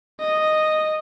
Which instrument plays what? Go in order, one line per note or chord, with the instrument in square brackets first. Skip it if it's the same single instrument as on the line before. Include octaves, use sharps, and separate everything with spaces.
[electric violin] D#5